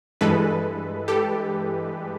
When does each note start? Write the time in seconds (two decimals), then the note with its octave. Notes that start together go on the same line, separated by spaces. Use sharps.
0.21 G2 E3 G#3 A4 B4
1.08 G4 A4